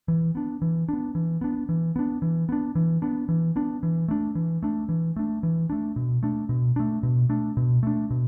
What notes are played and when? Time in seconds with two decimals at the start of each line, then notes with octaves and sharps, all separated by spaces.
0.08 E3
0.35 B3 D4
0.62 E3
0.89 B3 D4
1.15 E3
1.41 B3 D4
1.69 E3
1.96 B3 D4
2.22 E3
2.49 B3 D4
2.75 E3
3.02 B3 D4
3.29 E3
3.56 B3 D4
3.83 E3
4.08 A3 D4
4.35 E3
4.63 A3 D4
4.89 E3
5.16 A3 D4
5.43 E3
5.70 A3 D4
5.96 B2
6.23 A3 D4
6.49 B2
6.76 A3 D4
7.03 B2
7.29 A3 D4
7.57 B2
7.83 A3 D4
8.10 B2